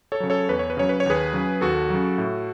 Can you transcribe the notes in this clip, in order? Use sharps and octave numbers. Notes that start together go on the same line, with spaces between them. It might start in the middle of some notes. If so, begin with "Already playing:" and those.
A4 C#5
C#3 F#3
A4 C#5
E2 B4
C#5
B4
C#3 F#3 C#5
B4
C#5
D#2 G#4 B4
C#3 F#3
D#2 F#4 A4
C#3 F#3
A2